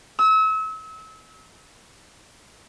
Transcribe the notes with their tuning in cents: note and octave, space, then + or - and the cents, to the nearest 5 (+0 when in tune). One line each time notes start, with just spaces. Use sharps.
E6 -35